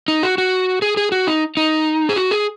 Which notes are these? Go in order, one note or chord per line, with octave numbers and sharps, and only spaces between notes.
D#4
F#4
F#4
G#4
G#4
F#4
D#4
D#4
G#4
F#4
G#4